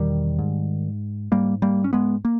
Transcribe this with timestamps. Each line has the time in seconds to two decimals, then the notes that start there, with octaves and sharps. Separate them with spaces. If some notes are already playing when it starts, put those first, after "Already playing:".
Already playing: E2 B2 D#3 G3
0.39 G#2
1.32 G#2 G3 A#3
1.62 G3 A#3
1.84 C#4
1.93 G#3 B3
2.25 A#3